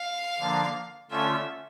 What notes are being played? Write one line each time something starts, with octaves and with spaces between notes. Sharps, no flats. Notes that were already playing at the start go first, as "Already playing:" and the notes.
Already playing: F5
D3 F3 A#3 D4
D3 A3 C#4 F4 E5